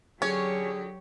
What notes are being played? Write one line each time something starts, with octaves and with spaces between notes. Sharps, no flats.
D3 F#3 C#4 G4 G#4 C#5